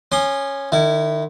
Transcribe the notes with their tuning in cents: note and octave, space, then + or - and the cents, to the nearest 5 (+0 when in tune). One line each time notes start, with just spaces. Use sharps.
C#4 -5 C6 +0 D#6 -35
D#3 -35 E4 +0